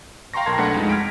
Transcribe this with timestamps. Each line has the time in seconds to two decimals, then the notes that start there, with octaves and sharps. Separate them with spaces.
0.34 F5 G5 A#5 C6 C#6 A#6
0.46 B1 A#4 A5 C6 G#6 A#6
0.57 B1 A3 D4 B4 F#5 C#7
0.74 F2 G#3 D#4
0.89 F6 G#6 A#6 B6 D7